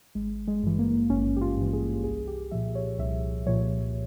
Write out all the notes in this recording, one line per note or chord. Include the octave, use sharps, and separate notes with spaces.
G#1 G#3
G#3
G2 E3
A#3
G#1 C#4
G4
F4
G2 E3
G#4
C2 G#4
G4
A#2 F3 E5
C#5
C2 E5
A#2 F3 C#5